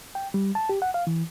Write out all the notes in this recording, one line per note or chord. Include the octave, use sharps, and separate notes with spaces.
G5
G3
A5
G4
F#5
F5
E3